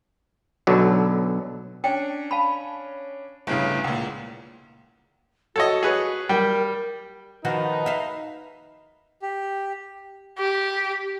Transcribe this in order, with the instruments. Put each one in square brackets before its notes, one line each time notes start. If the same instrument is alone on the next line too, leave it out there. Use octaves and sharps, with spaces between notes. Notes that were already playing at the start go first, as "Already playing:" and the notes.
[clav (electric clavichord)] B1 B2 D3 F#3
[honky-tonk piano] C#4 D4 [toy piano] G5
[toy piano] F5 A5 B5
[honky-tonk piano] G1 A2 C#3
[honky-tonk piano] C#2 A#2 [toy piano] F#5
[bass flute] F#4 [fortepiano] A4 C#5 D#5
[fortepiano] G#4 B4 C#5
[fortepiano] G3 G5 [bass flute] A#4
[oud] D#3 F3 F#4 [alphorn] D#4 [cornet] B4
[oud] E5 F5
[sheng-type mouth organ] G4
[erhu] G4